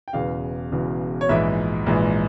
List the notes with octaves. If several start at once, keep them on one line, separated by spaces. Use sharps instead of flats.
G5
E1 E2 C#3 F5
E1 E2 C#3
C#5
A#1 G#2 E3 E5
A#1 G#2 E3